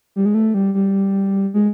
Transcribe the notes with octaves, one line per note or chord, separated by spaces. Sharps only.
G3
G#3
A3
G3
G3
G#3